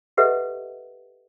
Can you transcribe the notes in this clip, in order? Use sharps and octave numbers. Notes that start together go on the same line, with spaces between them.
G4 A4 B4 D#5 E5 F#5